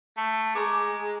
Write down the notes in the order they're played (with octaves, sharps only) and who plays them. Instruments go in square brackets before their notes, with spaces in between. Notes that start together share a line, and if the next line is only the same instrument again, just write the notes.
[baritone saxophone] A3
[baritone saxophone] G#3 [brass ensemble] G#4 [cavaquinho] A#5 C#6 D6